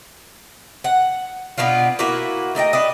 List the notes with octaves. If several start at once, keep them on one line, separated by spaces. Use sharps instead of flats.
F#5
B2 B3 D4 F4
A#3 E4 F#4 B4
A3 D#4 D#5 G5
D4 B4 D#5